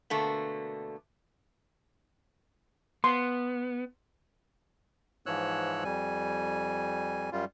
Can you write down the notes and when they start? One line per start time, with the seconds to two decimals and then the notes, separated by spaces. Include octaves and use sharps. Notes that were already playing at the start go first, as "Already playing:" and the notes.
0.10 B2 D3 A3 A#3
3.04 B3 C6
5.26 G#2 E3 F3 C#5 E6 F#6
5.84 F2 G3 G#5
7.32 F#2 G3 F4